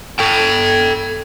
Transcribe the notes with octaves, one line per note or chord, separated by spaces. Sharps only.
A4 G5